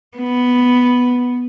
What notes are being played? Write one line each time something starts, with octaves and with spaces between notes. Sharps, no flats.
B3